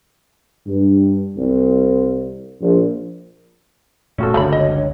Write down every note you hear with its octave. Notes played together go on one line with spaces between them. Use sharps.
G2
C2
A#1
E1 A#2 A3 C#4 F#4 A4
G1 C#2 D3 A3 C#5 D#5 B5
D#5